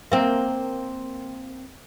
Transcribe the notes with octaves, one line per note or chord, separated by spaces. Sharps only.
A#3 C4